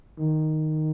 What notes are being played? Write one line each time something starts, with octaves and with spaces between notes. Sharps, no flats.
D#3